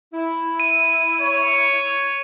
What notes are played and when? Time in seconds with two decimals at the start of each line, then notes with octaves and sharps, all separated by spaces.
0.13 E4
0.60 D#7
1.22 C#5